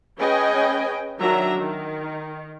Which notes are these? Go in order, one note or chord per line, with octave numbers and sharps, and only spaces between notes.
C#4 G#4 B4 D#5 G5 G#5
D#3 F#3 D4 E5 A#5
D#3